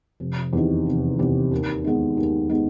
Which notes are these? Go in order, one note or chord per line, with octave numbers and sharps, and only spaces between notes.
F1
E2 C3 D#3
F1
E2 C3 D#3
D#2
D#3 G#3 B3
D#2
D#3 G#3 B3